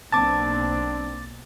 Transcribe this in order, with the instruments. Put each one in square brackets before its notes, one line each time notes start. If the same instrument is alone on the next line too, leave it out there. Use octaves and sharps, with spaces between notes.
[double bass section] B1 A#3 C4 [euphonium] D4 [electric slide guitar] A5 [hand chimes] D6 A6